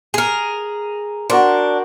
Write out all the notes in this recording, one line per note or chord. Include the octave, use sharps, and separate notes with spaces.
G#4 A#4
D4 F#4 A#4 C5